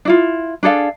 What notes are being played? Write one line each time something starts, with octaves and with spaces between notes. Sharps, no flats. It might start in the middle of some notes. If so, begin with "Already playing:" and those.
D4 E4 F4
D4 G#4 A4 F5